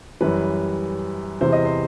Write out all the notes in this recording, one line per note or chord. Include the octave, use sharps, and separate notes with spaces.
F#2 E3 G3 B4
E2 C3 E3 C5
D#5
C5